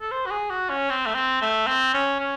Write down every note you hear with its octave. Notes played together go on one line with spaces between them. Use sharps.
A4
C5
F#4
G#4
F#4
C#4
C4
A3
C4
A3
C4
C#4
C#4